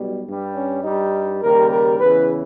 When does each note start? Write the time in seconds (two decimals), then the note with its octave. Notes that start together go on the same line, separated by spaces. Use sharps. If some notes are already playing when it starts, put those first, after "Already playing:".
Already playing: B1 B2 G3
0.27 G2 G3
0.56 C#4
0.84 G2 G3 D#4
1.42 D#2 C#3 G3 A#4
1.71 A#4
2.00 E2 C#3 E3 B4